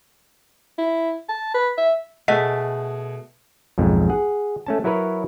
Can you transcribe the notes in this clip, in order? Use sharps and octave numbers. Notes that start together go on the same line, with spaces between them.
E4
A5
B4
E5
B2 A3 G#4 D#5 F#5 B6
B1 F2 G#2
G#4 F#5
A3 C#4 A5
F#3 E4 A#4 B4 C#5